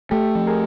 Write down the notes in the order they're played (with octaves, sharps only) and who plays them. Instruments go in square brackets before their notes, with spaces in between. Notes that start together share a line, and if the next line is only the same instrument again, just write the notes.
[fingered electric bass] A3 [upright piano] G4 A4
[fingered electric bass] F3
[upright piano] G#4 A#4